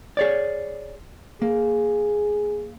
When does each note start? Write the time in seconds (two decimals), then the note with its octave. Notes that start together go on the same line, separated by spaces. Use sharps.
0.17 G#4 C#5 D5
1.42 A#3 G#4